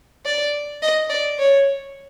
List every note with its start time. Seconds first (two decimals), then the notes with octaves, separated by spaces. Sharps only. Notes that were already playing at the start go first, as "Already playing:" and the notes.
0.26 D5
0.82 D#5
1.10 D5
1.39 C#5